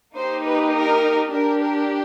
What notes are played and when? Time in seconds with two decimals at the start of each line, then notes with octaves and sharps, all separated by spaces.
0.16 A#3 D#4 G4 C5
0.45 B4
0.74 A#4
1.32 D4 G4 A#4
1.61 A#4